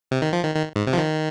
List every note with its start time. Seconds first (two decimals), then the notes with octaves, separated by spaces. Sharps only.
0.11 C3
0.22 D#3
0.33 F3
0.44 D#3
0.55 D#3
0.76 G#2
0.87 C3
0.93 F3
0.98 D#3